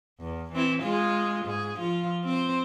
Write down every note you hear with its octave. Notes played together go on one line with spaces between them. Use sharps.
E2
E3 C4 E4
G#3 F4 G#4
G#2 G#4
F3 F4
C4 C5